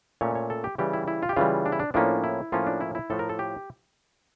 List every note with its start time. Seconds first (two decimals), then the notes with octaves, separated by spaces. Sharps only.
0.21 A#2 A3 C#4 C#5
0.35 C#5
0.50 A4
0.64 G4
0.78 C#3 E3 G3 G4
0.93 E4
1.08 E4
1.23 F4
1.29 G4
1.36 C#3 E3 G3 F4
1.66 D4
1.72 E4
1.80 D4
1.94 A2 F3 A#3 C#4 D4
2.24 E4
2.52 A2 F3 A#3 C#4 F4
2.67 D4
2.81 E4
2.95 E4
3.10 A2 F3 A3 A4
3.19 A#4
3.29 A4
3.39 G4